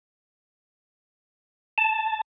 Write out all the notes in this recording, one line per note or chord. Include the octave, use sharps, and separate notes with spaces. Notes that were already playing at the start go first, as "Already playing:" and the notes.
A5